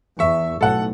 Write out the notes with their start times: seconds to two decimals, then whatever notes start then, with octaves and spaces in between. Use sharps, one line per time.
0.19 E2 E5 C#6
0.61 B1 A2 A4 F#5